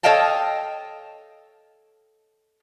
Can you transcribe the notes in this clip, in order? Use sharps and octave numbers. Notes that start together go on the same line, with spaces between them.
A4 C#5 D#5 F5 G5 A5